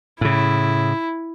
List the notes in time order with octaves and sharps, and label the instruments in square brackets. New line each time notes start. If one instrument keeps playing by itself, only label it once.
[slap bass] A2 C#3 [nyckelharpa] E4